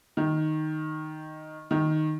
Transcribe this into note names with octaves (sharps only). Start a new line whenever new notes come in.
D#3
D#3